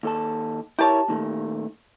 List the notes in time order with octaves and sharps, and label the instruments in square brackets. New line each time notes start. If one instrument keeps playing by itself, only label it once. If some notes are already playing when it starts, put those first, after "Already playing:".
[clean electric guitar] D#2 A4 A5
[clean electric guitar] E4 A#4 C#5 [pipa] G4 A5
[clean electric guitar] A#2 D#3 A3